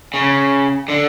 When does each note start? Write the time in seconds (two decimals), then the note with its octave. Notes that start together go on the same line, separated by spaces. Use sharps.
0.14 C#3
0.88 D3